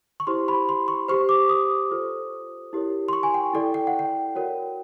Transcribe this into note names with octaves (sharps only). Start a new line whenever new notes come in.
C#6
E4 G4 C5 C6
B5
C6
C#6
G4 C5 C#6
D6
D#6
F4 A4 C5
E4 G4 A#4 C#5
C6
C#6
G#5
G5
E4 A4 D5 G5
G5
F#5
G5
F#4 A#4 C#5